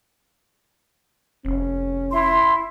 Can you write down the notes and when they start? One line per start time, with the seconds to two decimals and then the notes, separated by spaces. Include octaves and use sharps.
1.45 F1 C#4
2.11 E4 C6